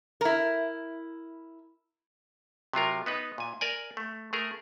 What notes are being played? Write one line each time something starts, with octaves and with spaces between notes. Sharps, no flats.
E4 A#4
C3 F#3 F4 A#4
B3 D#4 B4
A#2 G#5
A#4 D5 G#5
A3
A3 G#4 A#4